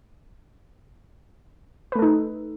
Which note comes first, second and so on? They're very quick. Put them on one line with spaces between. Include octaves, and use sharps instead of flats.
B4 A3 A4 D#4